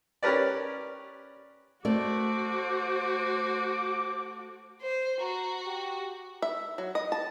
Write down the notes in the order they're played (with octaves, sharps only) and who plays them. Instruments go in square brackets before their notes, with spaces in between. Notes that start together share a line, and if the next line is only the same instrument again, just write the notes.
[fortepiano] C#4 G4 A#4 B4 D5
[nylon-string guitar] A3 D5 [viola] F#4 [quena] C5 [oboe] D6
[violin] C5
[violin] F#4 [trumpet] A#5
[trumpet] G4
[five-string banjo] E5
F#3
D#5
A5